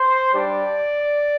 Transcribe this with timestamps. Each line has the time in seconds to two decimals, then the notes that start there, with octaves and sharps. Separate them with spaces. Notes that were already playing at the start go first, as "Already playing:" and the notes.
Already playing: C5
0.33 G3 D4 G4 D5